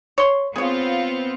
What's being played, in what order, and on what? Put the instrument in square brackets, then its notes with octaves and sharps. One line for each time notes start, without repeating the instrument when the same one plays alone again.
[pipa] C#5 C6
[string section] B3 C4 F4 [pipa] G#4 C#5